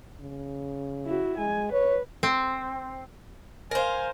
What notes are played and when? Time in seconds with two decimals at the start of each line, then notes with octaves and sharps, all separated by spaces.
0.21 C#3
1.06 E4 F#4
1.38 G#3 G#5
1.73 B4 C#5
2.23 C4
3.71 A#4 C5 F5 G#5